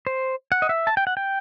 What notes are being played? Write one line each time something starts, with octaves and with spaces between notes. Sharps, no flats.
C5
F#5
D#5
E5
A5
G5
F#5
G5